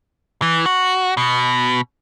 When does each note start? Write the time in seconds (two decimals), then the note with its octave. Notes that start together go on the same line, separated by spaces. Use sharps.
0.42 E3
0.66 F#4
1.17 B2